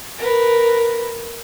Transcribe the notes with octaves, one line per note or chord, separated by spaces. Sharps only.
A#4 B4